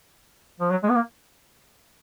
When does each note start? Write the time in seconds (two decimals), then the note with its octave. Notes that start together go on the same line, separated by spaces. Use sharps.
0.60 F3
0.71 F#3
0.83 G#3
0.89 B3
0.95 A#3